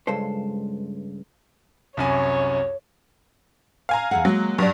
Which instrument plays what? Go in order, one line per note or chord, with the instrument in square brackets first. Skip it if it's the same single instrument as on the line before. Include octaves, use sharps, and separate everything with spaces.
[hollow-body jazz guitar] C#2 G2 G#3 A4 C5
[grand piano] C2 F#2 G#5 [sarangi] C#5
[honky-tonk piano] F5 G#5 A#5
[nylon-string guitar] E2 A4 F#5
[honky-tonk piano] F#3 [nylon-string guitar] G#3 A#3
[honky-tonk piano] G2 D4 [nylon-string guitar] F#3 G4